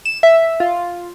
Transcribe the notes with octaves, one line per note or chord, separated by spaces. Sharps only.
E7
E5
F4